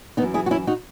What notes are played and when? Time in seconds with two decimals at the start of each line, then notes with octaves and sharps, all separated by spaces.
0.17 F#2 E3 B3 D#4
0.34 E4 G#4
0.46 F#4
0.51 C#4 E4
0.67 D#4 F#4